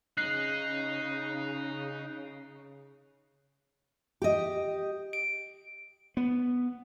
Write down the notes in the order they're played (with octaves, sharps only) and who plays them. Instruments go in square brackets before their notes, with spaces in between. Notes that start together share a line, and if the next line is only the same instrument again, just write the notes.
[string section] C#3 [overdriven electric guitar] D#4 [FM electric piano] F#6 C7
[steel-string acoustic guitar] G4 D#5
[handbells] D7
[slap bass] B3